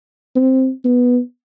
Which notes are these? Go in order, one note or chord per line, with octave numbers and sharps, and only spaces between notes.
C4
B3